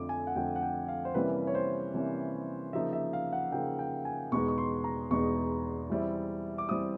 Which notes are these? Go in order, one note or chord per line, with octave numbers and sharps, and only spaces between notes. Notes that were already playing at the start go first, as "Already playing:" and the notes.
Already playing: F2 D3 F3 A3 D6
G#5
F#5
F2 D3 F3 A3 G5
F#5
G5
F5
C5
C3 E3 G3 A#3 C#4 B4
C#5
C5
C3 E3 G3 A#3 C#4
C#3 F3 A#3 D#4 E5
E5
F5
F#5
C#3 F3 A#3 D#4 G5
G5
G#5
E2 B2 G#3 B3 D#4 C#6
C#6
C6
A#5
E2 B2 G#3 B3 D#4 C#6
E3 G3 C4 E4
D6
E3 G3 C4 E4 D#6